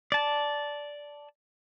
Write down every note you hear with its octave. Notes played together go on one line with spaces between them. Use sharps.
D5 A5